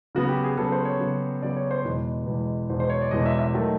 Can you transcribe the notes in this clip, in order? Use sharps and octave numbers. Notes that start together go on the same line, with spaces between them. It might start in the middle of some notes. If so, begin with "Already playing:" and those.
C#3 F#3 B3 F#4
G4
G#4
C#3 F#3 B3 A4
C5
C#5
C#3 F#3 B3
C#3 F#3 B3 D5
C#5
C5
E2 B2 G#3 B4
E2 B2 G#3
E2 B2 G#3 C5
C5
C#5
D5
E2 B2 G#3 D#5
E5
E5
D#3 F#3 A3